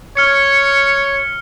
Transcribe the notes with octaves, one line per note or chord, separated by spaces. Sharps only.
C#5 F6 C#7